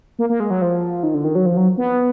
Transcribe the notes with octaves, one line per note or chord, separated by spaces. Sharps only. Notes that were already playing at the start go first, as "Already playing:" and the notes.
A#3
A#3
G#3
F#3
F3
D#3
D3
D#3
F#3
F3
F#3
B3